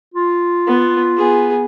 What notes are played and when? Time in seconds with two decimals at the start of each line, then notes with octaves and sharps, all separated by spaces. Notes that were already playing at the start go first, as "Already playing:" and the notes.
0.14 F4
0.67 B3
1.17 B3 G#4